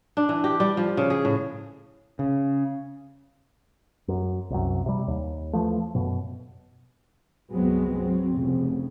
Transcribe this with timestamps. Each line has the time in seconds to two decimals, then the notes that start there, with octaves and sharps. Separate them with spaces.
0.17 D4
0.29 E3
0.44 G4
0.60 G3
0.77 F3
0.97 C#3
1.10 G#4
1.25 A2
2.19 C#3
4.08 F#2
4.50 C2 F#2
4.86 C3 G3
5.08 D#2
5.53 E3 F3 A3
5.95 F#2 B2
7.51 G1 C2 F#3 G#3 B3 C4
7.96 F#3 C4
8.35 F1 C#3